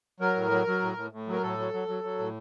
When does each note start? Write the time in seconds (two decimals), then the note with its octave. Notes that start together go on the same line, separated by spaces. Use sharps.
0.20 F#3 A#4
0.36 A2
0.51 F#3
0.67 F#3
0.82 A2
0.97 A2
1.12 A2
1.27 F#3
1.33 A#4
1.43 A2 A4
1.58 F#3
1.73 F#3
1.88 F#3
2.04 F#3
2.19 A2